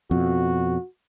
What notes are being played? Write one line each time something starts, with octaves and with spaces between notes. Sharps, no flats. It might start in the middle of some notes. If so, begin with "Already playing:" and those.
F2 B2 F#4